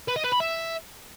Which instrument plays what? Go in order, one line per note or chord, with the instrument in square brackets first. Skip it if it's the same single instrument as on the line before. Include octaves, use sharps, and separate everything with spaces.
[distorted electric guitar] B4
D#5
B4
B5
E5